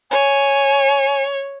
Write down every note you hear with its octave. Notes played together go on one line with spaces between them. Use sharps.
C#5 G#5